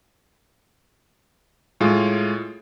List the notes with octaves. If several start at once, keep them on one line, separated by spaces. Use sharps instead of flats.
A2 G#3 F4